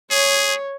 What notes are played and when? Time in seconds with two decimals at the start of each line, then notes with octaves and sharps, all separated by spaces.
0.11 G#4 C#5